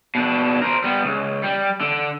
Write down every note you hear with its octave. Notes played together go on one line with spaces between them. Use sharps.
B2 D4
A#4 C5
G3 B3
C#2
G3
D3